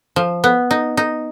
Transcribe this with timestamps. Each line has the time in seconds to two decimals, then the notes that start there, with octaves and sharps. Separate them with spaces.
0.16 F3
0.44 B3
0.71 D#4
0.97 D#4